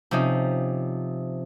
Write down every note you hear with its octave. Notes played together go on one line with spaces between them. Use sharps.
C3 F3 C#4 D#4